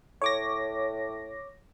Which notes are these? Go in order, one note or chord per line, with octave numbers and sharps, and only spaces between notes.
A2 C#5 D6 A#6